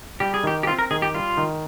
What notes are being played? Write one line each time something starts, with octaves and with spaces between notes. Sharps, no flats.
G3 G4
G#4
D#3 G4
G4
C4 F4
A#4
D#3 G#4
G4
G3 F4
D#3